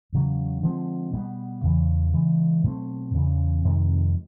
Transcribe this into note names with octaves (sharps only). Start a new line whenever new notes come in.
E2 C#3 F#3
D3 F3 G#3 C4
B2 G3 B3
E2 C#3 E3
C#3 E3 G#3
B2 F#3 A3 C4
E2 C#3 E3
F2 C3 D#3 G#3